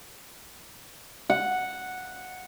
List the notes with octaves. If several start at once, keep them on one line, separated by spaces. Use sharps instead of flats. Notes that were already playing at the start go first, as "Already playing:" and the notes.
F#5